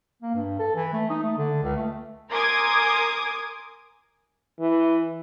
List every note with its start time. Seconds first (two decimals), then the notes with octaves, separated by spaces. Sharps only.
0.22 A#3
0.34 G2
0.59 A4
0.75 E3
0.93 A3
1.10 D#4
1.23 A3
1.37 D3
1.63 C#2
1.76 A3
2.29 A#4 G#5 C6 D6 D#6 G#6
4.60 E3